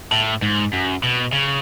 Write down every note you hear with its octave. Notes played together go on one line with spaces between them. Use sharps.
A2
G#2
F#2
B2
C#3